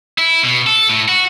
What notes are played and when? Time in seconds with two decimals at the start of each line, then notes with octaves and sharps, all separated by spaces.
0.18 E4
0.43 B2
0.66 A4
0.90 A2
1.08 F#4